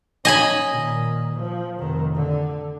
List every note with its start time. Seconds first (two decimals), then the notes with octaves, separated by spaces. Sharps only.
0.25 C#4 D#5 G#5 B5
0.68 A#2 D#3
1.36 F3
1.79 F1 D#3
2.15 D3